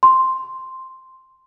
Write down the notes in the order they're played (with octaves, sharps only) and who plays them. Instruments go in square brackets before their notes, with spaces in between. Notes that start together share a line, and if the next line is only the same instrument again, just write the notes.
[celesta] C6